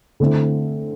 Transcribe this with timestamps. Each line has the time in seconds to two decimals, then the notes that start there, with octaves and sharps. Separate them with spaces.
0.20 D3 A3 C4 E4